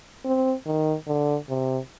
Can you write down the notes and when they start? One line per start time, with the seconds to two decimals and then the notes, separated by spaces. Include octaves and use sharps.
0.25 C4
0.66 D#3
1.07 D3
1.49 C3